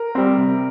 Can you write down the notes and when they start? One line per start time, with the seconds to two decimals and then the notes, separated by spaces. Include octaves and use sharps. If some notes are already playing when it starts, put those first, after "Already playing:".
Already playing: A#4
0.15 G3 C4
0.36 C3